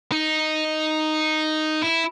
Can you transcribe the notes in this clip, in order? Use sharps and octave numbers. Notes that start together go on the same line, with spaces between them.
D#4
E4